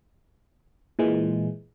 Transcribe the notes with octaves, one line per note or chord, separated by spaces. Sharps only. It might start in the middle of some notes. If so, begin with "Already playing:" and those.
A#2 E3 G#3